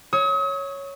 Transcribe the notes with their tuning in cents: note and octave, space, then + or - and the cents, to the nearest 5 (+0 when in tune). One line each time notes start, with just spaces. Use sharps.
C#5 +0 D#6 +45